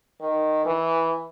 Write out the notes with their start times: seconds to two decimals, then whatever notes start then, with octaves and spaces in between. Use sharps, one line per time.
0.21 D#3
0.65 E3